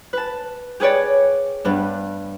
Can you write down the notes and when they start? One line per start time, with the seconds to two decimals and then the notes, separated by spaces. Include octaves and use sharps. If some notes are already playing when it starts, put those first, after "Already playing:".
0.13 B4 A5
0.80 G4 G#4 B4 C#5 D5
1.65 G2 B3 D4